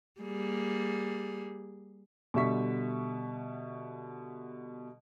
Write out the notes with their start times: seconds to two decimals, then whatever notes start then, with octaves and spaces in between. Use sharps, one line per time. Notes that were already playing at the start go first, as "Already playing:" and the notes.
0.21 G3 A#3 G#4
2.34 B2 D3 G3 E5 C#6 B6